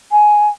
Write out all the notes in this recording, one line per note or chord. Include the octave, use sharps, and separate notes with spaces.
G#5